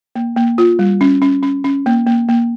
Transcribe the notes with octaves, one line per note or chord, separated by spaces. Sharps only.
A#3
A#3
F4
G3
C#4
C#4
C#4
C#4
A#3
A#3
A#3